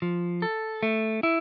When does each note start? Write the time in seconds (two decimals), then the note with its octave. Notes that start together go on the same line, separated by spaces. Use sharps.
0.02 F3
0.42 A4
0.83 A3
1.23 E4